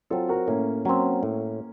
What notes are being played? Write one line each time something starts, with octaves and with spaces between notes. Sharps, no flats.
F#3 C4 F4 A4
F#4 A#4
A2 A#3 C#4
F#3 A#3 C4 C#4
A2